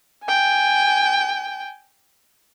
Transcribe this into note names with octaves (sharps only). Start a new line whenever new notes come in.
G5 G#5